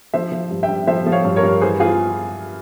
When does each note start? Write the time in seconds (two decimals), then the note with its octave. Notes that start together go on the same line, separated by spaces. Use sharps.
0.14 F3 C5 E5
0.32 F3
0.51 G2
0.63 E5 G5
0.68 G2
0.87 F3 C5 E5
1.06 F3
1.12 C#5 F5
1.25 G2
1.36 A#4 C#5
1.43 G2
1.62 E3 G#4 C5
1.80 E3 F4 G#4